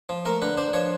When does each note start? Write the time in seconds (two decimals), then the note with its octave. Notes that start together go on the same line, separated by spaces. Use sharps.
0.09 F3
0.25 A3 A#4
0.42 D3 B4
0.57 D4 C5
0.73 F3 C#5